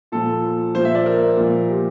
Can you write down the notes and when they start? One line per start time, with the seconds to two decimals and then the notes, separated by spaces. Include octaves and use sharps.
0.12 A#2 F3 A4
0.74 A#2 F3 C5
0.85 E5
0.95 D5
1.06 A#4
1.37 A#2 F3
1.68 G4